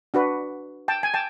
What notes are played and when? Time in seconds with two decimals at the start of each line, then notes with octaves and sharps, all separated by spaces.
0.14 D4 F#4 B4
0.88 G5 A5
1.03 G#5
1.14 G5 A5